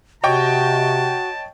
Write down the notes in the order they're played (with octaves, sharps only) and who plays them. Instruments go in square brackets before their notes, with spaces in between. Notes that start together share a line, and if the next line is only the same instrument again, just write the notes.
[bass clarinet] C3 [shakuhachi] F#4 [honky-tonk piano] C#5 D#5 G5 [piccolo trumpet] A5